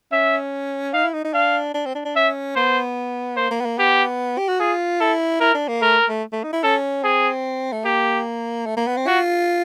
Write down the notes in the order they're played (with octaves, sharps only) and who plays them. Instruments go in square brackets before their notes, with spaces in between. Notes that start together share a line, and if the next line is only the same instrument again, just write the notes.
[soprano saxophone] C#4 [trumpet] E5
[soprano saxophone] D#4 [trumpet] F5
[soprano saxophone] E4
D#4
D#4
[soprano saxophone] D4 [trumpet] F5
[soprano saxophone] D4
C4
D4
D4
[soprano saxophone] C#4 [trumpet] E5
[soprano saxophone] B3 [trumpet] C5
[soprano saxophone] A#3 [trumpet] C5
[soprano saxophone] A#3
B3
A#3
[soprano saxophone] B3 [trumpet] G4
[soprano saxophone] G4
F#4
[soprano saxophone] F4 [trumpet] G#4
[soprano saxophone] E4 [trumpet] A4
[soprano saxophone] E4 [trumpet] A#4
[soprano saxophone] D4
A#3
[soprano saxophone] A3 [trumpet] A#4
[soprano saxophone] A3
A3
D#4
E4
[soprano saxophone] C#4 [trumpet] A4
[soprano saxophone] C4 [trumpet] G#4
[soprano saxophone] A3
[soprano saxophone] A#3 [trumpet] G4
[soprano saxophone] A3
A#3
B3
C4
[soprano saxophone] F4 [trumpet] F#4